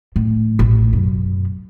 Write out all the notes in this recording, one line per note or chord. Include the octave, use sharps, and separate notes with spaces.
A2
A1
F#2 B2